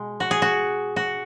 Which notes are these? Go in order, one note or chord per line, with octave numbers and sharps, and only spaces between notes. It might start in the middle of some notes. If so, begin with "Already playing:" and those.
Already playing: B2 G#3
F#4
G#4
F#4
F#4